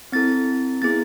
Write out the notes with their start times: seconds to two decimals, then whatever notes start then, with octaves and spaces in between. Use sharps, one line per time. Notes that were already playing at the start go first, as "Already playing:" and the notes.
0.12 C4 E4 A4 A6
0.82 B3 E4 G#4 A6